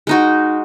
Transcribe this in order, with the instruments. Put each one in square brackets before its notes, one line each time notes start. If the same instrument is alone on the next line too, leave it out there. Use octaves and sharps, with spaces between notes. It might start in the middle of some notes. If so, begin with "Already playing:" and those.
[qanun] G#3 D#4 F#4